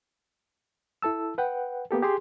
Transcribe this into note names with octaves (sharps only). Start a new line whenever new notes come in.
E4 A4 A5 E6
B4 F#5 G5
A#3 B3 G4 A4
G4 G#4 C6